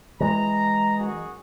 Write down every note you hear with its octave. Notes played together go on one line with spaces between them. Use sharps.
E3 G#3 A#5
F#2 F#4 G#4